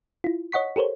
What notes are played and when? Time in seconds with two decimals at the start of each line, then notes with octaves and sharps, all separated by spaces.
0.24 E4 F4
0.52 C#5 D#5 F#5 C#6 B6
0.76 G4 A4 A#4 C5 C#5